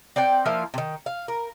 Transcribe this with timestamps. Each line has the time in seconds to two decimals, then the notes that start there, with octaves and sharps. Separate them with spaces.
0.16 C4 D5 F#5 G5
0.46 F3 A#3 E4 F5
0.74 C3 D#3
1.06 F5
1.28 A#4